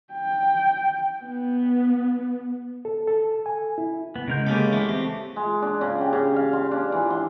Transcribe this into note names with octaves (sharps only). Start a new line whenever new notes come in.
G5
B3
A4
A4
G#5
E4
B3
C#3 G#3 A#4 G6
C#3 A#3 B3 G4 A4
E3 A3 E4
A3 C4 G4
G#3
D4
C#3
G4
C#3
F5
C6
D4
E3
C6